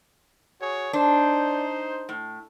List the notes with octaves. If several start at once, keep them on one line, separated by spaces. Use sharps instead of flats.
F#4 G#4 C#5
D4 D#4 C5
A2